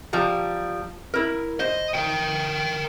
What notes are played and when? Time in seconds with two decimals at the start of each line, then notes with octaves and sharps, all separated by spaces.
0.13 F3 G3 A#5
1.14 E4 A#4
1.60 C5 D#5
1.94 A#4 G5